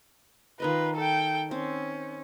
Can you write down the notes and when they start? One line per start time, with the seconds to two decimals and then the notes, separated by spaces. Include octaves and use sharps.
0.60 D#3 F4 A#4 B4 D#5
0.96 A4 G5
1.51 C4 C#4